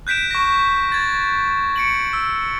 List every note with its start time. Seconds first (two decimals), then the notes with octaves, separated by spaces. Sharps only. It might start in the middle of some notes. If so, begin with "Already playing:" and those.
0.07 F#6 G6 B6 D7 E7
0.31 C#6 A#6
0.92 G#6 A6
1.76 C#7 D7 F#7
2.13 E6